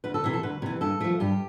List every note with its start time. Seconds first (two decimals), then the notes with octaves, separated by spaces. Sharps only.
0.04 D2 B4
0.14 A4
0.24 C3 E3
0.33 A4
0.43 D2 B4
0.62 C3 E3
0.81 G2 A4
1.00 F3 A3
1.20 G2 G4